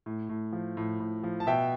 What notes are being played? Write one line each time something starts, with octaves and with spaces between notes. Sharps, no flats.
A2
A2
F3
A2
A2
F3
A5
B2 E5 G5